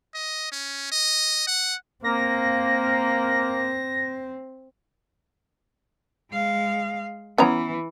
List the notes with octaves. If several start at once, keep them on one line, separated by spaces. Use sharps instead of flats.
D#5
C#4
D#5
F#5
A#3 C4 A#6
G#3 F5
E3 B3 C#4 A#5